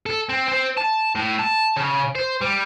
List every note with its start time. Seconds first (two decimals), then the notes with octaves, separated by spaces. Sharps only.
0.06 A4
0.29 C4
0.48 C4
0.77 A5
1.15 A2
1.39 A5
1.76 C#3
2.15 C5
2.41 G3